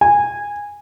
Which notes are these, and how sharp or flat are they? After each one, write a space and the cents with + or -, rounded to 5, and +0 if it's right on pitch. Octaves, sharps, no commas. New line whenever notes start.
G#5 -15